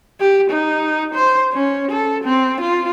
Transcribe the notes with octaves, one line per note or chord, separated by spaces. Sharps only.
G4
D#4
C5
C#4
A4
C4
F4